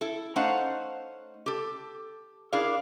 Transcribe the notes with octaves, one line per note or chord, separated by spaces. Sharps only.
E4 A4
A3 C#4 D#4 C5 F5 F#5
G4 A4
D4 E4 G#4 A#4 D5 F5